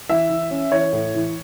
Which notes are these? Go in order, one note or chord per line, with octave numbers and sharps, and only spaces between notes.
E3 E5
E3
C#4
E3 C#5
A2
E3